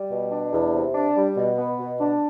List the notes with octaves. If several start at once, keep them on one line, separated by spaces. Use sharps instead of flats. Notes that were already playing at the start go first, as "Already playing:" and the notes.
Already playing: G3
B2
D4
E2
C3
D4
G3
B2
B3
B2
D4